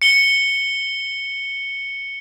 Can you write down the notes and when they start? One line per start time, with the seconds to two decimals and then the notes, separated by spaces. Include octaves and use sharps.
0.02 C#7 G7